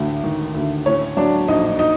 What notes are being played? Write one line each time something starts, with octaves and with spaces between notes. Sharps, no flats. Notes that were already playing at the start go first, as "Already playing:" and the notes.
Already playing: A1 D2
D#3
D2
A2 C#4 C#5
F#3 D4 D5
A#1 D#4 D#5
D#4 D#5